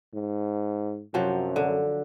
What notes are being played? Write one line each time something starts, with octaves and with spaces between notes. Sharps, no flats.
G#2
F#2 C3 F3 F#3
D3